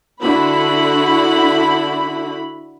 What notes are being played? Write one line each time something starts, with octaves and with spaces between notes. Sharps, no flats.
D3 E4 F#4 B5